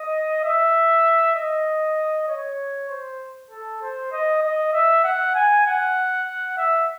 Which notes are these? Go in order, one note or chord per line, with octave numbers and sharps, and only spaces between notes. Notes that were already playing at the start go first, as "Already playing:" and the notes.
Already playing: D#5
E5
D#5
C#5
C5
A4
C5
D#5
D#5
E5
F#5
G#5
F#5
E5